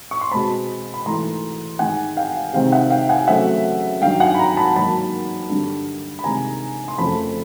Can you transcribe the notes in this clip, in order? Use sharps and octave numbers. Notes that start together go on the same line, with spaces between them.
C#6
C6
B2 G#3 C4 A5 B5
B5
G#2 E3 A3 A#5 C6
G#2 D#3 G#3 F#5 G#5
F5 G5
C3 D#3 G#3 C4 F5 G5
E5 F#5
F5 G5
F#5 G#5
C#3 F#3 A3 C4 E5 F#5
G2 D#3 F#3 F5 G5
F#5 G#5
B5
G#5 A#5
A5 B5
G#2 D#3 F#3 A#3 A5 B5
G2 D3 G3
B5
C3 D#3 G#3 G#5 A#5
C6
F2 C#3 F3 A3 C4 A5 B5